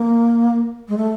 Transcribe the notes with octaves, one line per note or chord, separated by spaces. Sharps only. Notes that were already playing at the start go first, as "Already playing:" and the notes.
Already playing: A#3
G#3
A3